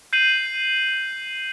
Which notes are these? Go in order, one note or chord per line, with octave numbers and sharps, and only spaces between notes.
G6 C7 D#7 F#7